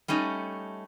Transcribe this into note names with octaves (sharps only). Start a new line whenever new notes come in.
G3 A3 C#4 D#4